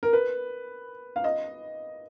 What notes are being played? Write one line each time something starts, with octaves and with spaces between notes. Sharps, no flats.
A#4
B4
F5
D#5